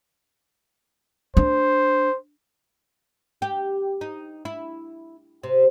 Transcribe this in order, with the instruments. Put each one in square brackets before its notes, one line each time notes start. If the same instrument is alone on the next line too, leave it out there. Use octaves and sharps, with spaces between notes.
[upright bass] D4 [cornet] C5
[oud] G4
D#4
E4
C3